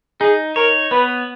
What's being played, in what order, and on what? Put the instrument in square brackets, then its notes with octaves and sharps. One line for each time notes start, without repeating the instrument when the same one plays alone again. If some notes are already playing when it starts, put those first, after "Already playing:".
[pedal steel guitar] D#4 [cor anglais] G#4
[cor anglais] A#4 [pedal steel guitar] C#5
[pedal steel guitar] B3 [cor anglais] B4